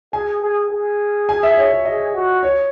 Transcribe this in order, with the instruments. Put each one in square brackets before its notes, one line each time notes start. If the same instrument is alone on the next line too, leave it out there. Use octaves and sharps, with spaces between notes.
[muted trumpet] G#4 [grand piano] G#5
[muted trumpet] G#4
G#4
[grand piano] G#5
E5
C#5
C#5
[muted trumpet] G#4 [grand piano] D#5
[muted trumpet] F#4
[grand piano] C#5